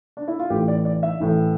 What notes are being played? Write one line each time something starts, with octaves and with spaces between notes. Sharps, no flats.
D4
E4
F4
A1 A2 E3 G4
D5
D5
E5
A1 A2 E3